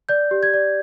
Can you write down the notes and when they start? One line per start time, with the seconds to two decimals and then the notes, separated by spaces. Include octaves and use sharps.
0.09 D5 G6
0.31 G4
0.43 G#6
0.54 D5